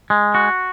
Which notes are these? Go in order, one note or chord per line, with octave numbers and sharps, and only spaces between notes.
G#3
F#4